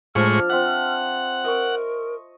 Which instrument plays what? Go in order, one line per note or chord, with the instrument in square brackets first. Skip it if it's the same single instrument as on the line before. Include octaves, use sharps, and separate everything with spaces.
[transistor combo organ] A2 G#3 C#6 [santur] F3 D4 A5 [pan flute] F6
[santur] C4 E5 [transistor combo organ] F#5
[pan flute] A#4 [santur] D#5 C#6